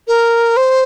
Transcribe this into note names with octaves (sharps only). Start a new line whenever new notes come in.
A#4
C5